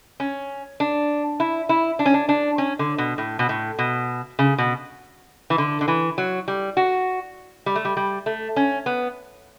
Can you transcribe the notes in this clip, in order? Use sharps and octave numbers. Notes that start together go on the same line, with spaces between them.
C#4
D4
E4
E4
D4
C#4
D4
D4
C#4
D3
B2
A2
B2
A2
B2
C#3
B2
E3
D3
D3
E3
F#3
G3
F#4
G3
A3
G3
G3
A3
C#4
B3